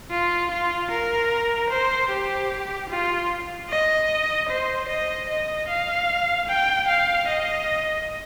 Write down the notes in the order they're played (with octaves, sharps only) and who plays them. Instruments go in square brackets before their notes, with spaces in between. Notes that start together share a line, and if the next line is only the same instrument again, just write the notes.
[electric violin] F4
F4
A#4
C5
G4
F4
D#5
C5
D#5
D#5
F5
G5
F5
D#5